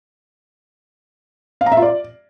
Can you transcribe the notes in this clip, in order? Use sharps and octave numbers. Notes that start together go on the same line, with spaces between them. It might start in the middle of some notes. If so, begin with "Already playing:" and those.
F5
A#5
E5
F4
D5